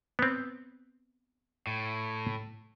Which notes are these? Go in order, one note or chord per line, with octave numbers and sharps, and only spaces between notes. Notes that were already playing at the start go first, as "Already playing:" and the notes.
B3 C4
A2